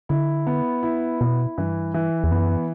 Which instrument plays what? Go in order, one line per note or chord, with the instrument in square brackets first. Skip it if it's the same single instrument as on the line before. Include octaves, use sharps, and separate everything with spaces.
[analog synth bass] D3 [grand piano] E4
[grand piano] B3
E4
[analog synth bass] B2 [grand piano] E4
[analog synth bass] G2 [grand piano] E3
[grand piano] E3
[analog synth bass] E2
[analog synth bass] F#2 [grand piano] B3